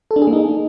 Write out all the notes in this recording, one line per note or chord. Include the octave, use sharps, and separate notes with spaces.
A4
D4
G#4
A#3
D#4